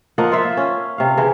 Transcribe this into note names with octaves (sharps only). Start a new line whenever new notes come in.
F3 A#3 D#5 F#5
F4 C5 E5
C#4
C3 F5
C#3 E3